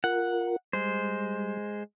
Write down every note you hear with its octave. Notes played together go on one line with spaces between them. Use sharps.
F4 A#4 F#5
G3 G#3 C5